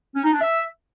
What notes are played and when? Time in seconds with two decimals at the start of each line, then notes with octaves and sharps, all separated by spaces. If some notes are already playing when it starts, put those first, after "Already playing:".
0.15 C#4
0.23 D#4
0.32 D4
0.41 E5